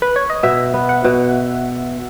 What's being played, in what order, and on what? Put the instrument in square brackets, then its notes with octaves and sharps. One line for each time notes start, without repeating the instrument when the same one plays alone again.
[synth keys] B4
C#5
D#5
[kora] B2 [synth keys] E5
[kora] B3
[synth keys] F#5
[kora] B2